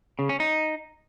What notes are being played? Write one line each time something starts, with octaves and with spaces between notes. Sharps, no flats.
C#3
C#4
D#4